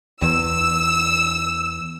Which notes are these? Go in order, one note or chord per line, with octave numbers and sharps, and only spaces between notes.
E2 E6